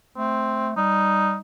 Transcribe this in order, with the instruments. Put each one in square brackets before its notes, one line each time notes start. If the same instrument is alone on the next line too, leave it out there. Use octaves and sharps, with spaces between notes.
[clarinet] A3 [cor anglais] C4
[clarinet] G3 [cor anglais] D#4